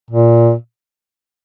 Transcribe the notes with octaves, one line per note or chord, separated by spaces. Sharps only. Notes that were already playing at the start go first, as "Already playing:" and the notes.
A#2